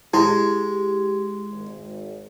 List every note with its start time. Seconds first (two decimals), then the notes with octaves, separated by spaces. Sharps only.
0.14 G#3 E4 G4
1.52 G#1